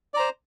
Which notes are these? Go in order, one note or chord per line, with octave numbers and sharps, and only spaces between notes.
C5 D5 A#5